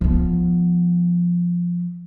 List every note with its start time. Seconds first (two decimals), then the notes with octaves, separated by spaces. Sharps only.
0.01 F3 B3